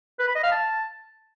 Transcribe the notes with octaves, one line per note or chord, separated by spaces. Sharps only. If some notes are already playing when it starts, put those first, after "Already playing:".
B4
B5
D#5
F5
A5